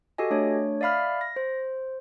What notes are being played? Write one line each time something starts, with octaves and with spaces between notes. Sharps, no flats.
F#4 G4 A4 D#5 G#5
A3 D4 C#5
D5 E5 F5 B5 F6
A#6
C5